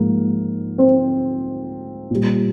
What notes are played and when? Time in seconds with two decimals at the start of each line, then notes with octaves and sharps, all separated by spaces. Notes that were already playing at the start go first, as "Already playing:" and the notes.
Already playing: G#2 F3 G#3 A#3
0.78 C4 C5
2.11 A#2 G3